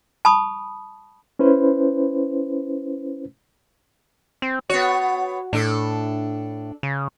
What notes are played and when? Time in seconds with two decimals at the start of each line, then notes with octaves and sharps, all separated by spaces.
0.25 A5 B5 C#6 D#6
1.39 C#4 E4 B4 C5
4.42 C4
4.69 B3 F#4 C#5
5.53 A2 D4 A4
6.83 C#3